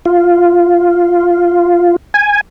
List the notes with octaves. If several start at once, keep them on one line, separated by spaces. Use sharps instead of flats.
F4
G#5